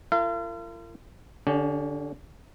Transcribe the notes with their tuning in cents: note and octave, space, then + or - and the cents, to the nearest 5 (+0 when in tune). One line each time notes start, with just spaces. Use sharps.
F4 -45 A#4 -40 F5 -45
D3 +0 C#4 +35 G4 +15